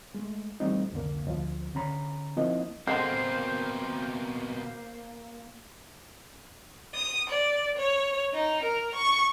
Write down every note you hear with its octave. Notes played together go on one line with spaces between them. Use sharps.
G#3 A3
E3 G3 A3 C4 D#4
C2 F2 D3 A#3
D2 F3
D3 C#4 A#5 B5
F3 A#3 C4 D#4 E4 D#5
B2 D3 G#3 A#3 C4 C5
D#6
D5
C#5
D#4
A#4
C#6